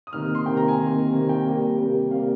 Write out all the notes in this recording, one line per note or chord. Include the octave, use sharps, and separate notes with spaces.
D#6
C3 D#3 A#3 F6
C6
C3 D#3 A#3 G5
A#5
G#5
C3 D#3 A#3
C3 D#3 A#3
G5
C3 G3 A#3
C3 G3 A#3
C3 G3 A#3 F5